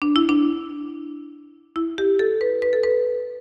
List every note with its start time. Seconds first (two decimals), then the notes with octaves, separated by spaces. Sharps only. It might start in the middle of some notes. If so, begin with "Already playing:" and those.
0.02 D4
0.16 E4
0.29 D4
1.76 E4
1.98 G4
2.19 A4
2.41 B4
2.62 B4
2.73 A4
2.83 B4